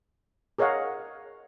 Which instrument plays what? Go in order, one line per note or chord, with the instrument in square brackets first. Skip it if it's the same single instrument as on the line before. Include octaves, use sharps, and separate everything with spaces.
[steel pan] G#4 A#4 C#5 D#5 F5 F#5